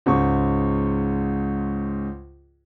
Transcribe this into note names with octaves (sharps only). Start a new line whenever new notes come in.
C#2 G#2 C#6